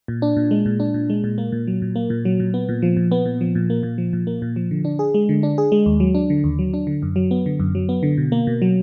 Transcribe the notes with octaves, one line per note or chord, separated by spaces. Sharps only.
A#2
D4
A#2
G#3
A#2
D4
A#2
G#3
A#2
A#3
A#2
F#3
A#2
A#3
A#2
F#3
A#2
B3
A#2
F3
A#2
B3
A#2
F3
A#2
A#3
A#2
F3
A#2
A#3
A#2
F3
D3
D4
G#4
G#3
D3
D4
G#4
G#3
D#2
F#3
D4
D3
D#2
F#3
D4
D3
F#2
F#3
B3
D3
F#2
F#3
B3
D3
B2
A#3
B2
F#3